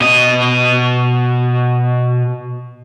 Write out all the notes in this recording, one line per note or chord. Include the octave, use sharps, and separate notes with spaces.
B2 D#5